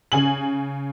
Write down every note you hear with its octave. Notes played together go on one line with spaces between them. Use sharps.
C#3 G#5 F#7